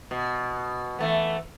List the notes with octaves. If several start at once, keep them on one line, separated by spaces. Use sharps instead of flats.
B2
E3 A3 B3